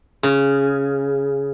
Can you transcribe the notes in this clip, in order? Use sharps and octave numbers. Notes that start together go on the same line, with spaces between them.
C#3